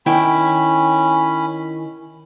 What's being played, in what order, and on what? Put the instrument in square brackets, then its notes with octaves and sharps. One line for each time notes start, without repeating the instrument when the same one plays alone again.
[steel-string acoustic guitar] D#3 E4 G5 [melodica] C#4 B5